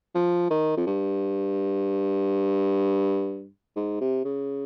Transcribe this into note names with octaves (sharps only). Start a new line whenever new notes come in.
F3
D#3
F2
G2
G#2
C3
C#3